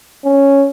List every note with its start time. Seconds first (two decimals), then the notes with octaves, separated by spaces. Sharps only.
0.25 C#4